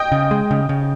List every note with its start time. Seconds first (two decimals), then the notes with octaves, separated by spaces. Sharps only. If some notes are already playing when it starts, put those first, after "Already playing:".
Already playing: D#5 G5 D#6
0.12 C#3
0.31 G#3
0.51 C#3
0.69 C#3